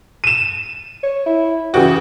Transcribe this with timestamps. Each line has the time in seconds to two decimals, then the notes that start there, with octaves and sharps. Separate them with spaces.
0.24 D#7 E7
1.03 C#5
1.26 E4
1.74 C#3 E3 F#4 G4